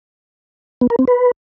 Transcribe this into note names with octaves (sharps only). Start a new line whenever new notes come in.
B3
A#4
C4
B4